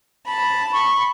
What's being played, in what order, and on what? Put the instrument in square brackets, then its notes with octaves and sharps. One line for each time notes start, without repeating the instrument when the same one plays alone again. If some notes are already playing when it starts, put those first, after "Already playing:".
[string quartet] A5 B5
[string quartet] B5 [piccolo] C#6